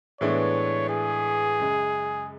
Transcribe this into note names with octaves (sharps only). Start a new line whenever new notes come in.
A2 E3 G#3 B3 D4 C#5
G#4
F#2 C#3 G#3